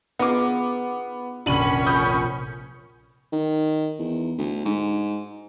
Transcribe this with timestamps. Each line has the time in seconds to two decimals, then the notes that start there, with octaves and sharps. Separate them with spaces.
0.19 B3 D#4 F4 G#4 D6
1.46 F1 A#1 D3 C#4 B5 D#7 F#7
1.87 D#6 G6
3.32 D#3
3.98 E2
4.38 D2
4.65 G#2